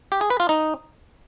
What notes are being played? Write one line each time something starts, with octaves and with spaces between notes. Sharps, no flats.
G4
G#4
B4
F4
D#4